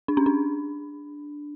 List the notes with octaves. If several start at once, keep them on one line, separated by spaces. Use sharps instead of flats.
D4
C#4
D4